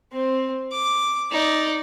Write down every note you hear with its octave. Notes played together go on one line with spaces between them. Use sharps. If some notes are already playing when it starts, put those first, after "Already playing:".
C4
D6
D#4 D5